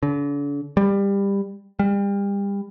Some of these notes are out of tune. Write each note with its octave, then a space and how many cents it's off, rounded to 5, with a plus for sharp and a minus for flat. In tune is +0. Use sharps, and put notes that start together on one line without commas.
D3 -40
G3 +20
G3 +35